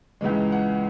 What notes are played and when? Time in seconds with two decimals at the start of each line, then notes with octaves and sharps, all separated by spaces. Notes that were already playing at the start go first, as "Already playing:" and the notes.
0.21 C#2 C#3 E3 G#3
0.52 F#5